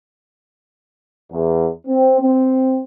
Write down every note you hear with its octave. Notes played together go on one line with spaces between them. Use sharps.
E2
C4
C4